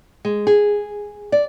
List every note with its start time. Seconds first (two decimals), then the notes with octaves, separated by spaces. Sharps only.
0.25 G#3
0.47 G#4
1.32 D5